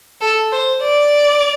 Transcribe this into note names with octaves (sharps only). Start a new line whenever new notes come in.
A4
C5
D5